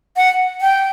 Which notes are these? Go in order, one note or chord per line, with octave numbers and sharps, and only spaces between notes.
F#5
G5